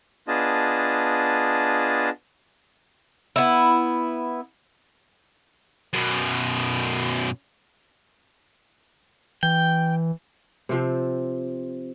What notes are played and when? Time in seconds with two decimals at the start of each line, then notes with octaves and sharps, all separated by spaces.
0.28 B3 D4 F4 G#4 D#5 A5
3.36 B3 E4
5.93 F#2 B2
9.43 E3 G5
10.69 C3 F3 C4